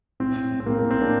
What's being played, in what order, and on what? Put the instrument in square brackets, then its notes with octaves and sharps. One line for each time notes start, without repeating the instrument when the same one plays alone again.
[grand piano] A2 C4
A2
A2
C4
A2 A#3
A2 A#3
C4
A2 A#3 D4